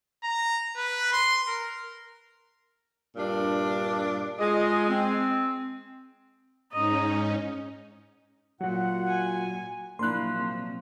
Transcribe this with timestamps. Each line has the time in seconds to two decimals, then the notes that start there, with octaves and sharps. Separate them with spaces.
0.24 A#5
0.76 B4
1.13 C6
1.48 A#4
3.17 G2 A#2 D4
4.39 G#3 F4 G#4 D#5
4.89 C4
6.72 G#2 C#4 D#4 D#5 A#5
8.61 A#2 F#3 F#4 F#5
9.08 G#5
9.99 A#2 F3 F#3 A#3 D4 E4 C6 F#6
10.39 C3